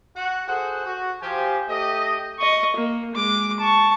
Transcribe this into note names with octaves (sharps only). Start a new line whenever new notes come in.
F#4 F#5
F#4 G#4 A4 C5 F#5
F#4
F3 G4 G#5
A3 G4 D#5
D#5 C#6
A#3
G#3 D6
A5 C#6